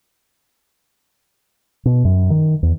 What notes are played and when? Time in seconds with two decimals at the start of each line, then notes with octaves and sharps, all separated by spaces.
1.85 B2
2.05 F#2
2.30 D#3
2.63 E2